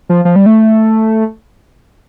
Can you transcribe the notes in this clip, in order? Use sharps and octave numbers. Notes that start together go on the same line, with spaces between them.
F3
F3
G3
A3